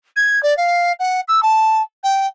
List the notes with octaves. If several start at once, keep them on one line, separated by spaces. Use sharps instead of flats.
G#6
D5
F5
F#5
E6
A5
G5